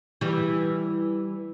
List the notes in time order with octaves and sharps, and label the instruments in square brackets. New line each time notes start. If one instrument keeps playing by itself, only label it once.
[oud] E3 G3